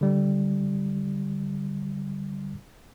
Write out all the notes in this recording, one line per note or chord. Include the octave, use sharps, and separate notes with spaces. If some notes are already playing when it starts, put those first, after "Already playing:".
D3 G3